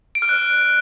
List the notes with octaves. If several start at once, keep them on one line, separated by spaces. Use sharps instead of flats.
D7
F6
F#6